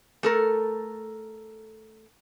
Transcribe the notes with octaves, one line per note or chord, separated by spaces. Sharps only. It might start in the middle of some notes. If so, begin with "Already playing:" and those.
A3 A4 A#4